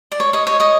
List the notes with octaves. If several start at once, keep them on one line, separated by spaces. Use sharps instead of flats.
D5
C#5
C#5 D#5
C#5 D#5
C#5 D#5